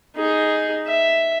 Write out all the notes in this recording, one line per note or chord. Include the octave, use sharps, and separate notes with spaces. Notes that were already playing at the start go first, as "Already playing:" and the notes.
D#4 G#4
E5